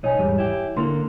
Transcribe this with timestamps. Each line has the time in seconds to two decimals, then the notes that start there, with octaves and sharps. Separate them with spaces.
0.04 B1 D#4 C#5 G#5
0.19 E2 G#2 G3
0.38 E4 G4
0.77 D3 A#3 E4 C6